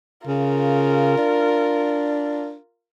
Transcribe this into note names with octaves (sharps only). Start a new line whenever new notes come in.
C#3 F4 A#4
D4